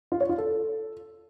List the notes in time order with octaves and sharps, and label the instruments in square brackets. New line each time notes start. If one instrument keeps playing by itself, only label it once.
[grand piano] F4
C#5
F4
A4